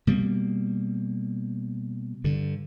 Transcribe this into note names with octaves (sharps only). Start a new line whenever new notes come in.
B2 G3 A#3
G2 D3